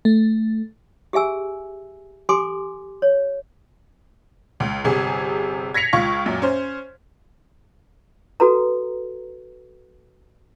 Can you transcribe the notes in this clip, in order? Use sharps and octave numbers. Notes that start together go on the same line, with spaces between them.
A3
G4 G#4 E5 G#5 E6
G4 A4 G#5 C6 D6
C#5
C#2
G1 C3 G#4
G#6 A#6 B6 C#7 F7
C#2 F4 C#6
F#2 A#2
C#4 C5
F#4 A4 B4 A#5